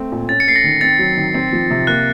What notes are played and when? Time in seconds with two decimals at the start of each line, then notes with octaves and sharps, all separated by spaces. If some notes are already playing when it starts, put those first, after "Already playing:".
Already playing: A3 C4
0.12 A#2
0.29 C#4 A6
0.40 C#7
0.47 A3 C7
0.56 A#6
0.64 D#3
0.81 C4 A6
0.99 F#3
1.17 D#3
1.34 C4
1.53 F3
1.70 C3
1.87 A#3 F#6